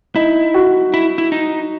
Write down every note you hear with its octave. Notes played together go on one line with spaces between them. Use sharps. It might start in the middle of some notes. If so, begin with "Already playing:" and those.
D#4 E4
F#4
E4
E4
D#4